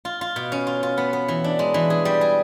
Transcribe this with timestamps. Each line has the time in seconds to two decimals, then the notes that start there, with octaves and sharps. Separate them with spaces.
0.05 F4
0.21 F4
0.36 B2
0.52 C#4
0.67 F4
0.83 F4
0.98 B3
1.13 B3
1.28 E3
1.44 D4
1.59 G#3
1.74 E3
1.90 G#4
2.05 G3
2.21 G#4